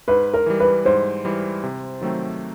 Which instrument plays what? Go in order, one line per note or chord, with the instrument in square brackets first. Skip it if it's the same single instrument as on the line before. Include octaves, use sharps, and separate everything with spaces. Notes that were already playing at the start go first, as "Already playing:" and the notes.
[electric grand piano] G#2 [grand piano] B4
[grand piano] A#4
[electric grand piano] E3 G3
[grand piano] B4
[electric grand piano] G#2 [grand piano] C5
[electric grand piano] E3 G3
C3
D#3 F#3 A3 C4